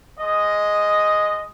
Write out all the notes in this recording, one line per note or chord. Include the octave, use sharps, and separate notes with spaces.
G#3 D#5